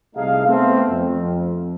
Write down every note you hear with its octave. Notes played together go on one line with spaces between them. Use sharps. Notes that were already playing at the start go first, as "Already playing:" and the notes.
C2 A3 D#4 G#4 F5
A3 B3 C4
F2